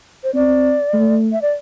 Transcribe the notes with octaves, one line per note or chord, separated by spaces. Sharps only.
C5
C4 D5
A3
E5
D5